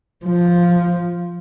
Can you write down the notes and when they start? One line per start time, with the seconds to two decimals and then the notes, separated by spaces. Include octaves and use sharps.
0.25 F3